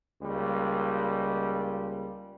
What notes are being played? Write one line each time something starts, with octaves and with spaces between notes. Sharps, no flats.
C#2 G3 A#3